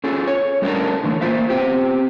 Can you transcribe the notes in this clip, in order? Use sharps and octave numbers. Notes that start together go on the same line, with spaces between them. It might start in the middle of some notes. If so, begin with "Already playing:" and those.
C#4 F4 G#4 A4
C#5
G3 A3 C#4 D4 A4 A#4
D3 E3 A3
A#3 F4 C5 E5 F5
B3 C4 G4 C5